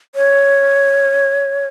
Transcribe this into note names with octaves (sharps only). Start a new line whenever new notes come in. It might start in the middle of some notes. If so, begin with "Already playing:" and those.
C#5